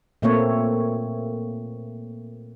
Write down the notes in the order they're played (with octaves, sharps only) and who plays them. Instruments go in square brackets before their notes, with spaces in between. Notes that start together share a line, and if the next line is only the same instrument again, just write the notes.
[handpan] A#2 A3 A#3 C4 C#5